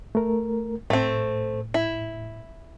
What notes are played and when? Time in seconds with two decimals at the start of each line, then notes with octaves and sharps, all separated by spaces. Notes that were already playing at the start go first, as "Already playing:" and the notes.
0.15 A3 A#4
0.90 A2 A3 C4
1.74 E4